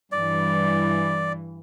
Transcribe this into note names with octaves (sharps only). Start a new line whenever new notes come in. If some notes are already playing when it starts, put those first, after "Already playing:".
G2 E3 D5